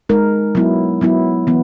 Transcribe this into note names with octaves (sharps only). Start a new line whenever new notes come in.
G#3 D#4 A#4
F#3 B3 E4
F#3 B3 E4
E3 B3